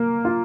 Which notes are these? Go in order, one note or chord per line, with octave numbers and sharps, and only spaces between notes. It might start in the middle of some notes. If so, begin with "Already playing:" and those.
Already playing: A#3
F4